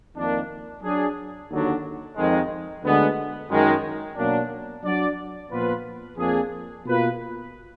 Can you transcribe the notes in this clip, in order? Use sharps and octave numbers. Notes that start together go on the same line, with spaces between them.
F2 D#3 A#3 D4
F#3 D4 G#4
D#2 D3 F#3 D4
F2 D#3 G#3
D2 D3 G#3 B3
F#2 D#3 G#3
B2 F#3 A#3 D4
F#3 D4 F#4 D5
A#2 F3 B3 F4 B4
F2 F3 A#3 D4 G#4
B2 A#3 F4 B4